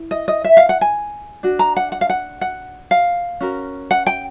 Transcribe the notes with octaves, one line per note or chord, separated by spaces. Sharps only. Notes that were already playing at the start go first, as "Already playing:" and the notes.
Already playing: E4
D#5
D#5
E5
F5
F#5
G#5
D4 F#4
A#5
F#5
F#5
F5
F#5
F#5
F5
C#4 F#4 A#4
F#5
G5